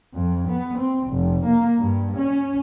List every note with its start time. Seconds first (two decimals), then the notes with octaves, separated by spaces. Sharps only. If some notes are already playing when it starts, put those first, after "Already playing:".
0.14 F2
0.48 B3
0.78 C4
1.09 F1
1.45 A#3
1.79 G2
2.18 C#4